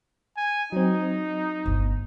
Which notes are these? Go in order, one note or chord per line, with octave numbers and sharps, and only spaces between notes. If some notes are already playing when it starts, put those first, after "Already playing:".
G#5
F#3 C4 D#4
G1 D2